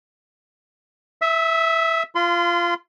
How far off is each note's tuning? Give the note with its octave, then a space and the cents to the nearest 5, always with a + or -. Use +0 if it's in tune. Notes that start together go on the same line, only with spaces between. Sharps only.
E5 +0 E6 -45
F4 -15 C6 -35